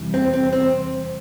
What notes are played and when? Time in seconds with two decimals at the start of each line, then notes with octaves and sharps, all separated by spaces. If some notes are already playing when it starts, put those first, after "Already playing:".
Already playing: E2 C3 E3 G3
0.14 C4
0.34 C4
0.53 C4